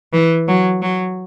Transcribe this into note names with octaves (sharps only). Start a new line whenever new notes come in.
E3
F#3
F#3